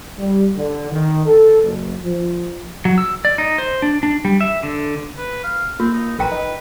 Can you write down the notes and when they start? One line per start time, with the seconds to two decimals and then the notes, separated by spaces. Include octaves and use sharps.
0.18 G3
0.56 D3
0.92 D#3
1.26 A4
1.62 F#1
2.03 F3
2.85 F#3
2.98 E6
3.25 D5
3.38 D#4
3.58 C5
3.82 D4
4.03 D4
4.25 G3
4.41 E5
4.63 D3
5.17 B4
5.43 F5
5.80 A#3 C4 F4
5.93 D#4
6.19 A#1 A#4 B4 G5 A#5
6.32 D#4